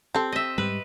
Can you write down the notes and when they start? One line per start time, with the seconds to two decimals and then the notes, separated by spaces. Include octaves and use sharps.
0.15 C4 G4 A4
0.32 D#5 E5
0.58 G#2 G3 B4